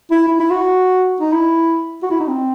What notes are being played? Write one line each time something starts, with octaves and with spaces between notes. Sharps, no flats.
E4
E4
E4
F#4
D#4
E4
F#4
E4
D#4
C4